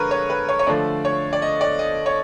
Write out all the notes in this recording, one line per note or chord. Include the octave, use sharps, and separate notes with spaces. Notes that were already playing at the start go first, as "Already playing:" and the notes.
Already playing: D3 F3 G#3 A#4 B4 C#5
C#5
B4
C#5
C#5
D3 F3 A3 D5
C#5
D5
D#5
D5
D#5
C#5